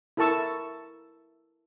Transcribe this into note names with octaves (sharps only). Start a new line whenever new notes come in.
E4 A4 A#4 A5 C#6 E6